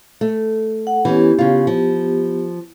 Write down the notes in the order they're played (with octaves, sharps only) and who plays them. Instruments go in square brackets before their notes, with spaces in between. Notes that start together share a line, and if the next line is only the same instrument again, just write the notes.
[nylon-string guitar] A3
[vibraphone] F#5
[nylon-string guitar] E3 C#4 [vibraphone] B3 G4
[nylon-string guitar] C#3 F4
F3